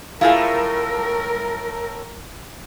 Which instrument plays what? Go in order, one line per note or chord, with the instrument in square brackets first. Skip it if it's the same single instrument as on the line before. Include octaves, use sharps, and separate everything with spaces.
[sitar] A2 A3 [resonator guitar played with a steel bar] E4 F4 G#4 [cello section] A#4 [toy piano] F5